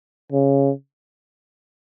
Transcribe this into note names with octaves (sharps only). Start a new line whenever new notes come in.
C#3